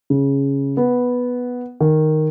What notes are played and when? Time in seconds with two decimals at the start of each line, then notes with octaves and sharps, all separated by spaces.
0.10 C#3
0.77 B3
1.80 D#3